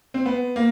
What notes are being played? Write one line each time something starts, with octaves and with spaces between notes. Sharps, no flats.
C4
B3
A#3